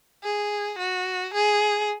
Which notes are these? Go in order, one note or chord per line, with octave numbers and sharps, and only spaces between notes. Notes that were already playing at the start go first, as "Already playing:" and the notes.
G#4
F#4
G#4